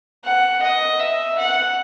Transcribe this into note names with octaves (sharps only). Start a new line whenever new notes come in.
F#5
D#5
E5
F#5